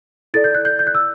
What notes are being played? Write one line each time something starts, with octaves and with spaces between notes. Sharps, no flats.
E4 A4 D5 A6
G6
F#6
G6
G6
F#6
E6